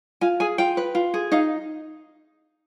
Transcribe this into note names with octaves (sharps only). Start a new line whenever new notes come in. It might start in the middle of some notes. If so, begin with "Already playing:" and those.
F4 G#5
G#4 G#5
F4 G5
B4
F4
G#4
D#4 F5